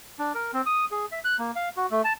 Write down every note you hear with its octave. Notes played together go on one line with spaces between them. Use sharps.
D4
A#4
C4
D#6
G#4
E5
F#6
A#3
F5
F#4
A3
A5